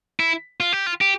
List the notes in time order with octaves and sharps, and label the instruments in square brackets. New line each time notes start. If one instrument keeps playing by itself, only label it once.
[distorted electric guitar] E4
F4
G4
F4
G4